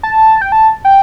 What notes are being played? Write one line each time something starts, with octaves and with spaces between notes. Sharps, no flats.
A5
G5
A5
G5